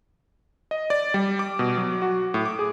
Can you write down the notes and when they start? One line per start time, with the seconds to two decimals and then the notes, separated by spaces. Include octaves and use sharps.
0.71 D#5
0.90 D5
1.14 G3
1.39 D6
1.59 B2
1.77 F#3
2.02 F#4
2.34 A2
2.46 D6
2.59 G#4